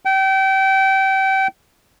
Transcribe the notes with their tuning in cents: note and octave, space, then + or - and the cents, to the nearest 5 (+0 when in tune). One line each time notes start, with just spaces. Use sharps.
G5 -30